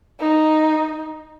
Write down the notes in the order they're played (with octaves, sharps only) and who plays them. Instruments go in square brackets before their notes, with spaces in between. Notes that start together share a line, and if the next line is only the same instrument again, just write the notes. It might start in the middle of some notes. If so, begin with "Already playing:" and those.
[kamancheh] D#4